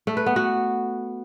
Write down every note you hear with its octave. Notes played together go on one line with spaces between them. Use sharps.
A3
B4
B3
F#4